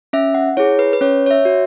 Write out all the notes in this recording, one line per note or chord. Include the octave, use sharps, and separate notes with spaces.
C#4 E5
F#5
E4 G#4 C#5
B4
B4
C#4 C#5
C#5
E5
F#4